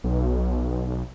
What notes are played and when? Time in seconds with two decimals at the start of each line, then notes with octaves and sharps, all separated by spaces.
0.04 B1